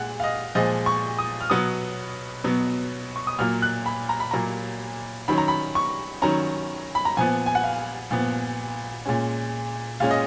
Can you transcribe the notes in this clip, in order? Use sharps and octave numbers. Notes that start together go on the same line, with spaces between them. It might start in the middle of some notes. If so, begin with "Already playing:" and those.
Already playing: A#2 G#3 F#5
F5
D#5
A#2 F3 G#3 D#5
C#6
D#6
F6
B2 F#3 B3 D#6
B2 F#3 B3
C#6
D#6
A#2 F#3 A#3 F6
F#6
B5
A#5
B5
A#2 F#3 A#3 A#5
D#3 F#3 C#4 B5
A#5
B5
C#6
D#3 F#3 C#4 A#5
B5
A#5
A#2 F3 B3 G#5
G#5
F#5
F5
A#2 F3 B3
A#2 G#3 C#4
A#2 G#3 C#4 F5
D#5